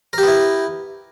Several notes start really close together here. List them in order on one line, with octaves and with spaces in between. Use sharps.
A#4 G4 B3 E4